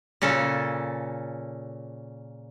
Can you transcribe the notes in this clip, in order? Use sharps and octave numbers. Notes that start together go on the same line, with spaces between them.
A#2 C#3 C#4 A4